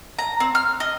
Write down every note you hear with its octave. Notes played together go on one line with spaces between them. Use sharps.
A#5
C4
F6
D#5